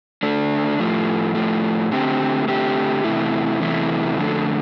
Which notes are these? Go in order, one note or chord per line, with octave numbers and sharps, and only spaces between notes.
D3 A3 D4
A2 F3 A3
A2 F3 A3
D3 A3 C4 G4
D3 A3 C4 G4
E2 C3 E3 A3 E4
E2 C3 E3 A3 E4
F2 D3 A3